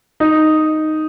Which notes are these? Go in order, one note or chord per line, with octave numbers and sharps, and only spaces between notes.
D#4